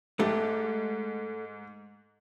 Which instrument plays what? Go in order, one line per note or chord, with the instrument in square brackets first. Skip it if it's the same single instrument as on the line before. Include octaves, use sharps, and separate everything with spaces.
[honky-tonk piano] G#2 [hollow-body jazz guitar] A3 G4